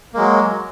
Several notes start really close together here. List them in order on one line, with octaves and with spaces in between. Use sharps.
A#3 G#3 F#3